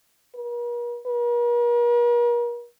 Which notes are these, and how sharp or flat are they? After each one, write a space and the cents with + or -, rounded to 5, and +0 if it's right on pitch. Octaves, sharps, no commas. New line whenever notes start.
A#4 +45
A#4 +45